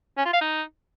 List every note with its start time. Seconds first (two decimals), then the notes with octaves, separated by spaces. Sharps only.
0.18 C#4
0.26 F4
0.33 F5
0.41 D#4